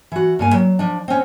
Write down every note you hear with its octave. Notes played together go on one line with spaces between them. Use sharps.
E3 F#4
G2 A#3 G#5
F#3
F3 D4
C4 C#4